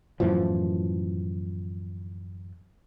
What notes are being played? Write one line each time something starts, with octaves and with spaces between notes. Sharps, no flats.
F#2 A2 E3 F3